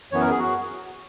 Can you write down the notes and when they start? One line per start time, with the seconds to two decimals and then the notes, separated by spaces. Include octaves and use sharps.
0.11 F#2 E3 B3 C#5
0.21 A#4
0.30 G#4
0.39 F#4